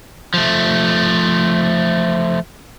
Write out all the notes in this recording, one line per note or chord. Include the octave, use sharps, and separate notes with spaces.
F3 A3